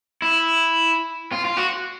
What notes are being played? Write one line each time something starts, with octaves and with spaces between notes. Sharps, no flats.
E4
F4
F4
F#4